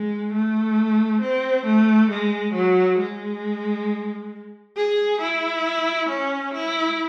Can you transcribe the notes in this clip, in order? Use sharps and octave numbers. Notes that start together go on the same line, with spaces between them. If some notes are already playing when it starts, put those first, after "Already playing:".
Already playing: G#3
A3
C4
A3
G#3
F#3
G#3
G#4
E4
C#4
E4